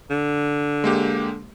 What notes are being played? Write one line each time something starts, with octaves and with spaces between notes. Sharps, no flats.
D3
G#3 A#3 G4